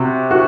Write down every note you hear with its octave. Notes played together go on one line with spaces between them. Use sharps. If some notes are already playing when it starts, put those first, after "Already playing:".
Already playing: C3 F#4
F#4